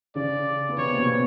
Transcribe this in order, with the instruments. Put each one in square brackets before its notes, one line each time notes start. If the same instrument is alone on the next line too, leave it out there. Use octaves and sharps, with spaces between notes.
[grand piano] C#3 C#4 [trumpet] D5
[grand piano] B3
[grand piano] C3 C4 [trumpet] C#5
[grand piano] A#3
B2 B3